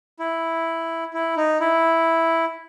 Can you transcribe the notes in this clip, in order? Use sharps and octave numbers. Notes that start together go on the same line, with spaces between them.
E4
E4
D#4
E4